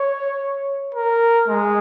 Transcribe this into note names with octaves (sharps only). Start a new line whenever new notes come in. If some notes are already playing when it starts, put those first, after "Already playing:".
Already playing: C#5
A#4
G#3